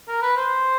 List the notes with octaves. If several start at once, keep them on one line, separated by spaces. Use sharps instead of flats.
A#4
B4
C5